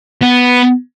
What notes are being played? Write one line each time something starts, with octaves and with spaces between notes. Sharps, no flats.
B3